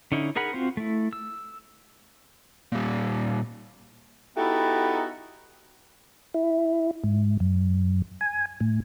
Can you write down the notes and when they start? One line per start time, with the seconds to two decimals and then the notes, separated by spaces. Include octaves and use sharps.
0.12 D3 C#4 D#4 E4
0.36 D#4 G#4 A#4 F#5 B5
0.53 C4 F4 F#4 C5
0.77 A3 E4
1.13 E6
2.72 A#2 G3
4.37 B3 D#4 E4 F#4 G4 A4
6.34 E4
7.04 G#2
7.40 F#2
8.21 G#5
8.60 A2